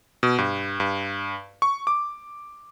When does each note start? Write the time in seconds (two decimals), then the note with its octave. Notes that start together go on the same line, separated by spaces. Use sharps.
0.23 B2
0.38 G2
0.80 G2
1.62 C#6
1.87 D6